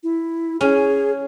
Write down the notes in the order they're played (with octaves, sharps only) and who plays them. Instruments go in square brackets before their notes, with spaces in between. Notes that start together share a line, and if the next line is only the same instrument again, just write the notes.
[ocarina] E4
[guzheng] C#4 [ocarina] G#4